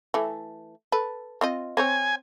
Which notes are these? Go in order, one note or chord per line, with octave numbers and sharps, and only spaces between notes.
E3 A3
A4 B4
C4 F4 D#5
C4 C5 C#5 G#5